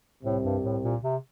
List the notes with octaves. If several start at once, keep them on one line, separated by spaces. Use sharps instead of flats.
C2 A2 C3
G2
A2
A#2
C3